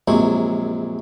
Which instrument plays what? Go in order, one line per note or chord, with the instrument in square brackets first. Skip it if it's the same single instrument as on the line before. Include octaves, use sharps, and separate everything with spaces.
[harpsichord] A#1 F#2 C3 F#3 G#3 C5